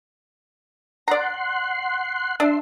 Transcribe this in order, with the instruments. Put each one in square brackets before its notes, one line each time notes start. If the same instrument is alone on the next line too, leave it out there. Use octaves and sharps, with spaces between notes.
[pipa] D5 A#5 [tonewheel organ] F#5 C6
[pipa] D4 [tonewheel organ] E5 C6